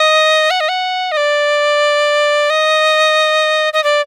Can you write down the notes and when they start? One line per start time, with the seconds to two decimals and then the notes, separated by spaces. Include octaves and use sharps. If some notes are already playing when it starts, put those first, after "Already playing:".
Already playing: D#5
0.51 F#5
0.60 D#5
0.69 F#5
1.12 D#5
1.17 D5
2.50 D#5
3.73 D#5
3.84 D5